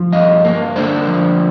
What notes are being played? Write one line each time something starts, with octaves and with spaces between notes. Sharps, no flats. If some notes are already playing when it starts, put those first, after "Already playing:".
Already playing: F3
G2 D#5 F5
A#3
D3 C5 D5
F3